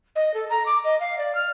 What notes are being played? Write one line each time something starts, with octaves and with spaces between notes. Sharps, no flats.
D#5
A4
A#5
D6
D#5
F5
D5
F6